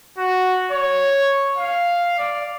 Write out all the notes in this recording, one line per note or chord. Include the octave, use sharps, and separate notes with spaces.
F#4
C#5
F5
D5